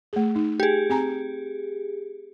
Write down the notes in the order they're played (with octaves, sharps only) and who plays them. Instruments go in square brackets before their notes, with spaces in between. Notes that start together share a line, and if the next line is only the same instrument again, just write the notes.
[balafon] A3 G#4
D#4
[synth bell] G4 G#4
[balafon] C4 G#5 A#5